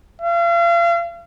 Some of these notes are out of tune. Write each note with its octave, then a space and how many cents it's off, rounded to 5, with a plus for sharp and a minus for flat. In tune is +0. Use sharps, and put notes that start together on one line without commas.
F5 -40